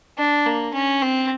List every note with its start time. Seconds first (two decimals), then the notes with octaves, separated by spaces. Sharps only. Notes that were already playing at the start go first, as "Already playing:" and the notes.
0.18 D4
0.46 A#3
0.74 C#4
1.02 C4